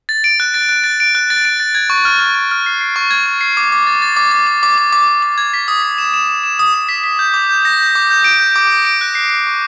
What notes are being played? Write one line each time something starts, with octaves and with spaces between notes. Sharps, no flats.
A6
D7
F#6
A6
F#6
A6
D7
F#6
A6
D7
A6
G#6
C#6
F6
C#6
C#6
F6
C7
C7
C#6
G#6
C#6
C7
D6
D6
A6
A6
D6
D6
D6
D6
D6
D6
D6
D6
G#6
B6
D#6
B6
E7
E7
E7
E7
D#6
D#6
B6
B6
G6
D6
G6
A#6
G6
D6
G6
D7
G6
D6
A#6
D7
F#6
C7
F#6
C#6